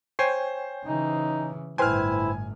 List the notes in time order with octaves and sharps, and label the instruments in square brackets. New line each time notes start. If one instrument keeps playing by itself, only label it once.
[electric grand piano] C5 C7 [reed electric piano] C#5 G5 G#5
[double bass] C#3 E3 [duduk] D#4
[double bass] G1 A2 [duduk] E4 [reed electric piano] B4 C5 G5 [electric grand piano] G#5 F6